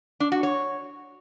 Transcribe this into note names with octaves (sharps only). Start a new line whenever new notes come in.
D4
F#4
C#5